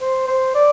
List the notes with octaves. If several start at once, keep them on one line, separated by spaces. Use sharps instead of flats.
C5
C5
D5